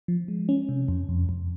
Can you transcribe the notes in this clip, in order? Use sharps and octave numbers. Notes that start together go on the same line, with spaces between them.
F3
G#3
C#4
C3
F2
F2
F2